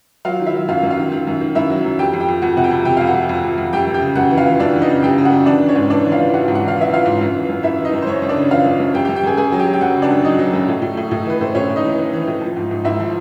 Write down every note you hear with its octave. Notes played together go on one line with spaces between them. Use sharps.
F#3 F4 F5
D#3
E4 E5
F#3
F#2 F4 F5
F#2
F4 F5
D#3
D#3
F#2
D#3
F#2 E4 E5
F#3
F#2
F2 G4 G5
F2
G4 G5
F2
F2 F#4 F#5
C3 F#5
G4 G5
F2
C3 G4 G5
F2 F5
F#4 F#5
F2
F2
F2
F2
F#2 G4 G5
F#2
G4 G5
C#3
F#2 F#4 F#5
E3
F4 F5
E3
F#2 D4 D5
E3
D#4 D#5
C#3
F#2 G4 G5
C#3
F#4 F#5
F#2
E3 D4 D5
E3
C#4 C#5
G#2
E3 D4 D5
E3
F4 F5
E3
E3 F#4 F#5
G#2
F#5
E3
F5
E3 E5
E3 F4 F5
G#2
F#2
E3
F#2
F#2 E4 E5
E3
D#4 D#5
F#2
C5
F#2 C#4 C#5
F#2
D4 D5
C#3
E3 F4 F5
F#2
F#2
F#2 G4 G5
G4 G5
F#2
G4 G5
F#2 G#4 G#5
F#2 G#4 G#5
F#3
G4 G5
F#3
G5
F#2 F#4 F#5
C#3
D4 D5
F#2
F#3 D#4 D#5
F#3
F#2
A2
A2
A2
A2
E3 B4
A2 C5
A2 C#4 C#5
A2
D#4 D#5
E3
E3
E3
A2
F3
G#2
G#2
G#2 E4 E5
F3